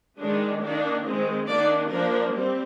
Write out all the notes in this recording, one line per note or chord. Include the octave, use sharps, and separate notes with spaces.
D#3 G#3 D4
D#3 A#3 D4
D#3 G#3 C4
D#3 A#3 D4 D5
F3 A#3 D4 A#4
G3 C4